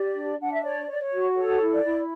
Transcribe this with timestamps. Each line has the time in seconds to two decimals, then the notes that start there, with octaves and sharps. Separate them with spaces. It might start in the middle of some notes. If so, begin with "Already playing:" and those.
Already playing: G4 D5
0.13 D4
0.38 D4 F#5
0.52 E5
0.62 C#5 D5
0.86 C#5
0.90 D5
0.99 C#5
1.11 F#4
1.35 A4 C#5
1.60 E4
1.73 D5
1.84 E4